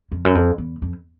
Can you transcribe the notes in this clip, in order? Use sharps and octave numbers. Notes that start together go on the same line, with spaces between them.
F2
F#2
F2
E2
F2